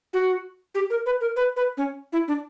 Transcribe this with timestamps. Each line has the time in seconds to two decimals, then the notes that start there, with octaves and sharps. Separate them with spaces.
0.13 F#4
0.75 G4
0.90 A#4
1.06 B4
1.21 A#4
1.36 B4
1.56 B4
1.77 C#4
2.12 E4
2.28 D4